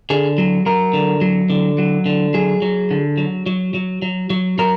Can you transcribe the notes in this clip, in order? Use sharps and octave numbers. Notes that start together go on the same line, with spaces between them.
D3 G#4
F#3
F#3 A#4
D3
F#3
D3
F#3
D3
F#3 G#4
F#3
D3
F#3
F#3
F#3
F#3
F#3
F#3 A#4